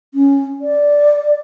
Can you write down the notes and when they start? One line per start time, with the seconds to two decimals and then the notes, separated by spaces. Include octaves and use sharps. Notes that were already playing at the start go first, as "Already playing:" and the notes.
0.14 C#4
0.61 D5